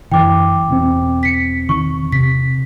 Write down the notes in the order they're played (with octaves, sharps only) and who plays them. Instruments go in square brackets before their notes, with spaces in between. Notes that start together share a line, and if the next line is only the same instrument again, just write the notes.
[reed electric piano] F#2 [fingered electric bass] E3 [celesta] G5 D6
[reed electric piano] E2 B2 C4
[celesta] B6 C#7
[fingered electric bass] D#3 [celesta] C#6
[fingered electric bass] C3 [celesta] B6